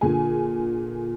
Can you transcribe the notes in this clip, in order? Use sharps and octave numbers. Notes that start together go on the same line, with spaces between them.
A#2 D3 G#4 G#5